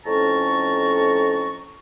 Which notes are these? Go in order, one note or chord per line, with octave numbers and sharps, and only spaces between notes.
F2 A2 C#4 A5 A#5 C#6